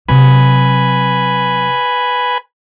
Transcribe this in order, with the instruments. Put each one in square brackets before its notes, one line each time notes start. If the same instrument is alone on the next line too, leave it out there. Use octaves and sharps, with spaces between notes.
[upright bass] C3 F#3 [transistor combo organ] B4 G#5 B5